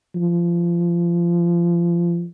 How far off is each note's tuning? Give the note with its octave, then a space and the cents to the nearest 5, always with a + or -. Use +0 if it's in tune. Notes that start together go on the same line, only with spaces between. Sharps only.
F3 -25